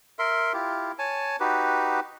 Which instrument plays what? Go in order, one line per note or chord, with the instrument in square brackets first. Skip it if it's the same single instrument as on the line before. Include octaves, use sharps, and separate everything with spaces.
[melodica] A#4 E5 C6
E4 F4 G4
C#5 G#5 A5
D#4 F#4 G4 B4